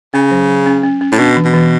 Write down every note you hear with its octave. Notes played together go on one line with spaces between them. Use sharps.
C#3 C#4
F#3
F#3
C#4
C#4
C#4
A2
B2 D4
E3
B2
E3